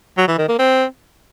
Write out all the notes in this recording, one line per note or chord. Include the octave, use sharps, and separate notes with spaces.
F#3
E3
D#3
A#3
C4